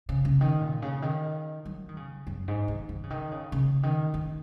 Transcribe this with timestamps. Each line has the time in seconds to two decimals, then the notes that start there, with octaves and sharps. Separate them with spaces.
0.09 C#3
0.25 C#3
0.41 D#3
0.61 A#2
0.82 C#3
1.02 D#3
1.65 F#3
1.89 D#3
1.97 C#3
2.27 F#2
2.48 G#2
2.68 D#3
2.89 D#3
3.03 C#3
3.10 D#3
3.31 C#3
3.52 C#3
3.83 D#3
4.14 D#3